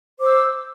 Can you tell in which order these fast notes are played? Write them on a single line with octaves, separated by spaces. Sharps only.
C5 D6 E6